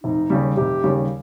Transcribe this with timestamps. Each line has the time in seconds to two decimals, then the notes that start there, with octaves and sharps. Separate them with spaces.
0.04 F1 D#4
0.30 D#2 C#3 G3
0.57 F1 G4
0.83 D#2 C#3 G3